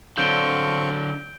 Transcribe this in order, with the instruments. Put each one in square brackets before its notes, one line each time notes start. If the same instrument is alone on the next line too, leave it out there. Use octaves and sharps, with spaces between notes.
[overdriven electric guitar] D3 F#3 [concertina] C4 F5 C#6 [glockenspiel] G6 D7 G7